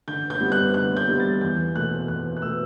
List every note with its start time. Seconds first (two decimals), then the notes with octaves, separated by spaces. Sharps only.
0.08 D3 G6
0.30 G6
0.41 G3 B3
0.52 F#6
0.74 D3 F#6
0.97 G6
1.08 G3 B3
1.20 A6
1.41 E2 G6
1.75 B2 A3 F#6
2.08 E2 F#6
2.37 F#6
2.42 B2 A3 E6